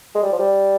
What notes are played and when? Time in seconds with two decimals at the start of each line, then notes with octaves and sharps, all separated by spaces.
0.15 G#3
0.23 G3
0.32 F3
0.39 G3